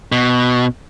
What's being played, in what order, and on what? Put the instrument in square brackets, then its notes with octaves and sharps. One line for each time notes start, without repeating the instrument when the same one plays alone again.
[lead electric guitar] B2